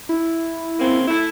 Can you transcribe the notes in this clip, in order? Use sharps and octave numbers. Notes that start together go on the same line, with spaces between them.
E4
C#3 A#3 C4
A3 E4